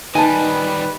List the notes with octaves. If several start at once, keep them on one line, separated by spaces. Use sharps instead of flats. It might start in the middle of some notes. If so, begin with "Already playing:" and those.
D#3 G3 D#4 B4 G#5 A5